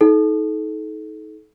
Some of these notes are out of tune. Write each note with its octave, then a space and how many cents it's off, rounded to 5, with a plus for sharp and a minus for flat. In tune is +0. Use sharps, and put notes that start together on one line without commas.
D#4 +30 A4 -35